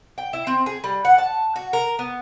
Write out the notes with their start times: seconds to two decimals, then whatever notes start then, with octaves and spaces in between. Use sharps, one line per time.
0.18 G5
0.33 E4
0.47 C4
0.66 G#4
0.84 G3
1.05 F#5
1.18 A5
1.56 F#4
1.73 A#4
1.99 B3